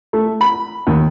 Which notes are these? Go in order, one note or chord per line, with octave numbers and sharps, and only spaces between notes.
A3
B5
D#2